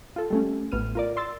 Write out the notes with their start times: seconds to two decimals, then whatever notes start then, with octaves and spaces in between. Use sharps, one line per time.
0.16 F4 A4
0.30 G3 A3 C#4
0.72 A1 A2 B3 F6 D#7
0.95 F4 A#4 D5
1.16 D5 C6 E6 A6